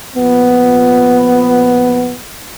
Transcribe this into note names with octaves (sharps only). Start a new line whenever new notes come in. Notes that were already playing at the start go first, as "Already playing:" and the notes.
A#2 F3 B3